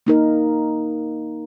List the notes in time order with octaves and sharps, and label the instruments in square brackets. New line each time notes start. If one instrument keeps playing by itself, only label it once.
[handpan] A#3 D#4 A#4